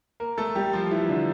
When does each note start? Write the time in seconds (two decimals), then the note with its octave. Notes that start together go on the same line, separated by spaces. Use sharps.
0.20 A#3 A#4
0.38 A3 A4
0.55 G3 G4
0.73 F3 F4
0.91 E3 E4
1.09 D3 D4